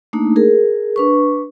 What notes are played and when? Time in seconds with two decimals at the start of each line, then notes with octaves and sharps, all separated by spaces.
0.13 A3 A#3 D4 D#4
0.36 G#4 A#4
0.96 D4 B4 C#6